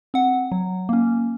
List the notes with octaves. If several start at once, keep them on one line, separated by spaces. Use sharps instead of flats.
C4 F#5
F#3
A#3 C#4